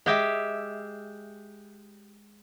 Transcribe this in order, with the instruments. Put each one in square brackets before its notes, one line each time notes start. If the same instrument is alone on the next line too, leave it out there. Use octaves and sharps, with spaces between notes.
[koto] G#3 G4 E5